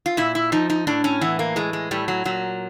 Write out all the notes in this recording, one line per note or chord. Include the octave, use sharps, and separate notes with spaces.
F4
A#2 E4
E4
F3 D#4
D#4
A2 D4
C#4
E3 B3
A#3
A2 G#3
G#3
A2 G3
F#3
A#2 F#3